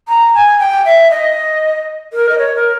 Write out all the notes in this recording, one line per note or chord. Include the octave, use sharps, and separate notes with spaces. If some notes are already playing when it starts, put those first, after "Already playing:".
A#5
G#5
G5
E5
D#5
A#4
D#5
C#5
A#4